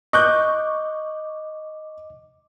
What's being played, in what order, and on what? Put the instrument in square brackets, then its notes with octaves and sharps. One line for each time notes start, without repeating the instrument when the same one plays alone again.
[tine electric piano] D#5 D6 [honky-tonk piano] C#6 F#6 G6